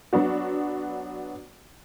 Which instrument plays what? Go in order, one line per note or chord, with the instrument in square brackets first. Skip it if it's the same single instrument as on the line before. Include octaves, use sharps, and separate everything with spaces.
[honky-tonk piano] F#3 B3 D4 F#4